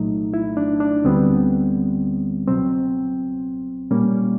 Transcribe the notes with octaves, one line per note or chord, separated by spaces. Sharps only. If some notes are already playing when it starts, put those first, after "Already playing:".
Already playing: C2 A#2 F#3 A3 D#4
E4
D4
D4
D2 D3 G3 B3 C4
C#2 B2 F#3 C4
A#2 G3 A#3 C#4